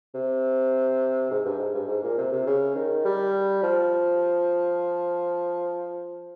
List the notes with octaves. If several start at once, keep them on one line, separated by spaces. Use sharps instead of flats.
C3
G#2
G2
G#2
G2
G#2
A#2
C3
C3
C#3
D#3
G3
F3